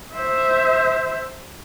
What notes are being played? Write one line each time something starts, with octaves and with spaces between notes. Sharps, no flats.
C5 E5